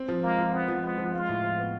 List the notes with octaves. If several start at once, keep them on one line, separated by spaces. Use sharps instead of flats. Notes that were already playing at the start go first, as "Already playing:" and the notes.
Already playing: C4
F3
G#3 A#3
F3
B3 C4
F3
G#3 B3
F3
G#3 F4
A2
F3
B3